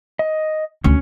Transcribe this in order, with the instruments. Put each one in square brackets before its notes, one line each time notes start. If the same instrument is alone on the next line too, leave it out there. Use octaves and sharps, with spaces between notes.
[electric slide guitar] D#5
[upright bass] D2 [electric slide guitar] C#4